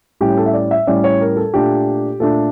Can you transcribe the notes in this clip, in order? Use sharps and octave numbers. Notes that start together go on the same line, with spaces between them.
A2 G3 C#4 G4
A4
E5
D5
E5
A2 G3 C#4 D5
C#5
A#4
A4
A#2 A3 D4 G4
A#2 A3 D4 A4